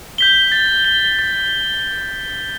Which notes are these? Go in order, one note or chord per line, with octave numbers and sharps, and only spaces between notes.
G6 B6 G7
A6
G7
A6